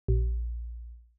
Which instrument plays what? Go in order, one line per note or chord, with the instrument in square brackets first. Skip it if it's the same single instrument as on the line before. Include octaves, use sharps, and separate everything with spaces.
[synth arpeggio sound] A#1